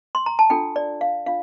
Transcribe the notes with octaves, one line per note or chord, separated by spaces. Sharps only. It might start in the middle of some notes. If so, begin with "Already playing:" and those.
C6
A#5
A5
D4 F4 A4 G5
D5
F5
D4 F4 F5